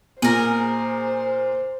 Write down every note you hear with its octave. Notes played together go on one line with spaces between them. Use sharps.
A#2 G#4 A#4 C5